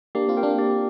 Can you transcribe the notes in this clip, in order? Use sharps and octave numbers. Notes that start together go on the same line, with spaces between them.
A#3 D4 G4
C4 F4
A#4 G5
A#3 D4
G4